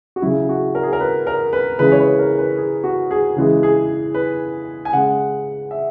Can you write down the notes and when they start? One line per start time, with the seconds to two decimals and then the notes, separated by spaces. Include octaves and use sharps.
0.16 F#4
0.22 C#3 F#3 E4
0.49 F#4
0.75 A#4
0.83 G#4
0.93 A#4
1.00 B4
1.27 A#4
1.53 B4
1.79 C#3 E3 G#3 B4
1.92 C#5
1.99 B4
2.19 A#4
2.39 B4
2.57 G#4
2.84 F#4
3.11 G#4
3.36 C#3 E3 G#3
3.63 G#4
4.14 B4
4.85 G#5
4.93 C#3 G#3 F#5
5.71 E5